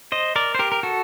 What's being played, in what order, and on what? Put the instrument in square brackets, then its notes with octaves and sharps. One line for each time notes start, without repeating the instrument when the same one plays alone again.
[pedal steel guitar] C5 D#5
A#4 D5
C5
G4 A#4
A#4
F#4 A4